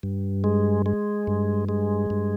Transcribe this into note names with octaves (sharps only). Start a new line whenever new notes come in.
G2
G#3
G#3
G2
G#3
G2